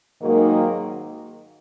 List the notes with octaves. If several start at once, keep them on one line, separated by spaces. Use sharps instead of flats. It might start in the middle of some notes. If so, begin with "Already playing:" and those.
G#2 D#3 F#3 A#3